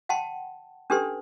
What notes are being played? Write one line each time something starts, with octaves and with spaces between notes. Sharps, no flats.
F#5 G5 A5 C6
C#4 D4 G4 A4 B4 C6